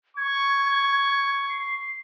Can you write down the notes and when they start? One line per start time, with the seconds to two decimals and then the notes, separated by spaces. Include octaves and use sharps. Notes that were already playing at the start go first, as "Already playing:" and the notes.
0.17 C#6 G#6
1.50 C7